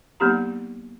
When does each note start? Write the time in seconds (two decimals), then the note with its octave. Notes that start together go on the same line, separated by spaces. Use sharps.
0.20 F#3 A#3 B3 D#4 G4 A#5